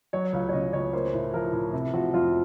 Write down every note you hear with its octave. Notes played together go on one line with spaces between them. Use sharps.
F#3 C#5
C#2 F5
C#5
C#3 D#5
C#2 C#5
A#3 C5
A2
F3 A#4
A2
C3
F3 F#4
F2 F4